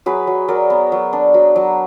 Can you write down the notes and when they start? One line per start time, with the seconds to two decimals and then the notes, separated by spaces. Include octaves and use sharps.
0.06 F#3 G#4 B4
0.27 F#3
0.48 F#3 A#4 D5
0.70 B3
0.92 F#3
1.13 D4
1.34 F#3
1.56 F#3